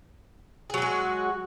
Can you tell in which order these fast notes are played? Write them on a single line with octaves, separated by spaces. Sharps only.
G#4 F#3 G#3 F#4